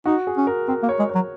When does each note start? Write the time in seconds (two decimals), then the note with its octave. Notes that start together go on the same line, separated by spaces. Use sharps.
0.05 D#4 F#4
0.27 G#4
0.37 C#4
0.47 A#4
0.68 C4 A#4
0.83 A#3
0.89 C#5
0.99 G#3
1.09 C#5
1.15 F#3